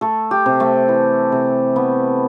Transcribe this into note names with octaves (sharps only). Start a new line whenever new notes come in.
A3 A4
G4
C3
A3
E3
C3
A3 B3